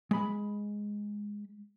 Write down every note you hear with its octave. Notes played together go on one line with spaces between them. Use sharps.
G#3 B5